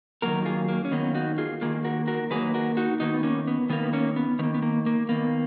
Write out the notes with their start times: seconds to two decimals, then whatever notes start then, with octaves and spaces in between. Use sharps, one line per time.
0.22 D#3 F#3 A#3 F#4 A#4
0.45 F4 G#4
0.68 A#3
0.85 C#4
0.91 D#3 F#3 A#3 B3
1.15 D#4 F#4
1.38 F4 G#4
1.61 D#3 F#3 A#3 F4 G#4
1.84 F#4 A#4
2.07 F#4 A#4
2.30 D#3 F#3 A#3 G#4 B4
2.54 F#4 A#4
2.77 D#4 F#4
3.00 D#3 A#3 B3 D#4
3.14 B3
3.23 A#3 C#4
3.47 B3
3.70 D#3 A#3 B3
3.83 B3
3.93 A#3 C#4
4.16 B3
4.39 D#3 B3
4.43 A#3
4.54 B3
4.62 A#3
4.86 A#3
5.09 D#3 A#3 B3